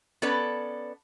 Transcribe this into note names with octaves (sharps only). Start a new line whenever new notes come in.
B3 C#4 A4 B4 D5